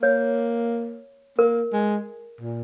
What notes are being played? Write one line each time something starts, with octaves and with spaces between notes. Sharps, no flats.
A#3 C#5
A#3 A#4
G#3
A#2